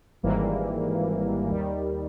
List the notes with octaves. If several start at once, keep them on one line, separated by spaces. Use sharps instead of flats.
G#1 G#2 E3 G3 A#3
D#2 D#3 G3